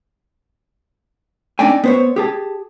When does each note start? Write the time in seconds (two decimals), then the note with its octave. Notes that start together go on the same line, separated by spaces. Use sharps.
1.59 C4 D4 D#4 D5 G5 G#5
1.84 B3 C5 C#5
2.16 G4 G#4 A5